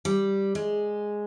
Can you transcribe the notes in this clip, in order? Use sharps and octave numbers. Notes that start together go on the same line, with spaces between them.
G3
G#3